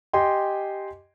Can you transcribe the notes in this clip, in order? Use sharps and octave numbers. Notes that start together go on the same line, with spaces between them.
G4 D#5 G5 G#5 C6